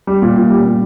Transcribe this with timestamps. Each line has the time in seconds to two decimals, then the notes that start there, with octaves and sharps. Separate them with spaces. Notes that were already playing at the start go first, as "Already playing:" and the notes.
0.07 G3
0.22 A#2
0.36 A#2
0.51 G3
0.66 A#2